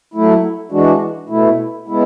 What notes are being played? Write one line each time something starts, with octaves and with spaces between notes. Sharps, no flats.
F#3 A3 E4
E3 G#3 D4 F#4
B2 A3 E4
C#3 G#3 B3 E4